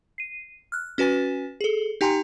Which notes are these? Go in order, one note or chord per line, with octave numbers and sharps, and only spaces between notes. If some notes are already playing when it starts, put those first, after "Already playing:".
C7 D#7
F6 F#6
C#4 F#4 B4 G#5 A6
G#4 A4
D#4 G4 G5 G#5 A#5 C6